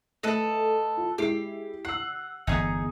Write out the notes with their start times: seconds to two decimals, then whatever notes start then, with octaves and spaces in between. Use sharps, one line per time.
0.23 A3 A4 B4 D#5
0.97 F4
1.18 G#3 E4 G4 C7
1.85 F#5 E6 C7
2.47 G1 E2 B3 D#4 G#4